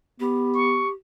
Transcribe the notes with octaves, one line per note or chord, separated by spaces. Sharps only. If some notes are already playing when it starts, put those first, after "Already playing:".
B3 G4
C#6